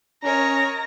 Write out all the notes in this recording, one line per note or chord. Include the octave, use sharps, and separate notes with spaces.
C#4 A#4 C#5 D#5 A#5